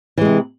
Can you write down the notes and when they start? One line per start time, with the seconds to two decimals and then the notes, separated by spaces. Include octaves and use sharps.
0.18 E3
0.21 G#3
0.25 C3